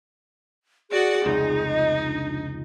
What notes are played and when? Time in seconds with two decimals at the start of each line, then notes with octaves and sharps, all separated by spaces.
0.90 F#4 G#4 D5 F#5
1.26 F1 C#2 D#4
1.68 D#5
2.08 D4